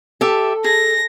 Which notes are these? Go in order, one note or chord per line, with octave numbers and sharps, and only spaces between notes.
G4 A4 E5 A5
G#4 A#6